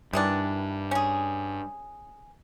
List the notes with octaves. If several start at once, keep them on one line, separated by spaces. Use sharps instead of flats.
G2 D#3 E3 D4
C#4 G#4 G#5